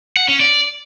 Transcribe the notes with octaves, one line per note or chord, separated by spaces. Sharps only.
F#5
C#4
D5